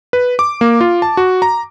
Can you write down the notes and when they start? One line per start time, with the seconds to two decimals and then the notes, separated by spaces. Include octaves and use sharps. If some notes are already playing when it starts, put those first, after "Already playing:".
0.13 B4
0.39 D6
0.61 A#3
0.81 F4
1.02 A5
1.17 F#4
1.42 A#5